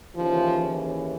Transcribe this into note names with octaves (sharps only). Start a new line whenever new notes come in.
D#2 C#3 E3 F3